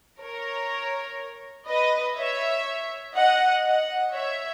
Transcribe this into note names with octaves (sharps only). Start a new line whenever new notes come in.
A#4 C#5
B4 D#5
C#5 E5
D#5 F#5
D#5 F#5
C#5 E5